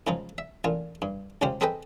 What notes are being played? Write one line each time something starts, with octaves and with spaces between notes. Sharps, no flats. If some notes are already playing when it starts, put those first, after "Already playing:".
G#2 C#3 F3 D#4
E5
A1 A#2 F4
G2
C#2 G#2 C#3 F4 G4 C5
C4 G#4 A4 B4 D#5 G5